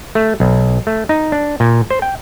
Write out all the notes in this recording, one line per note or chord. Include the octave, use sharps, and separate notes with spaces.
A3
B1
A3
D#4
D4
A#2
C5
G5